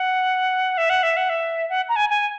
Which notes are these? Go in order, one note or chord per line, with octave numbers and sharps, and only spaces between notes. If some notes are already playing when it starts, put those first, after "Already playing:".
Already playing: F#5
E5
F#5
E5
F#5
E5
F#5
A#5
G#5
G#5